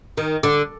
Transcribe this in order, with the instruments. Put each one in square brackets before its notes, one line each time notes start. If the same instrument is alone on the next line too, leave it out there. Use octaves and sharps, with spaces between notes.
[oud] D#3
D3